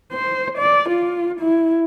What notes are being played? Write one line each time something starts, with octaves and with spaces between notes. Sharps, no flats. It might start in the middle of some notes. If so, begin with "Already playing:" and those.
C5
D5
F4
E4